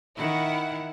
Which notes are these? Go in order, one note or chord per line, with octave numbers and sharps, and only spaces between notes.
D#3 E4 F#5